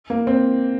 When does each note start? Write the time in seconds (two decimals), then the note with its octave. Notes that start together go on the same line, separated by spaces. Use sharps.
0.10 A#3
0.27 C4